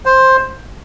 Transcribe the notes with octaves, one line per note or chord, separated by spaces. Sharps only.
C5